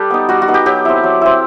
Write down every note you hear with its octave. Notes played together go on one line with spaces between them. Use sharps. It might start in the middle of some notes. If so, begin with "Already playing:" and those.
Already playing: G3 G4 A4 B4
B3 D#4
G3 F#4
F#4
B3 D#4
G4
F#3 G4
C4 E4
F#3
C4 E4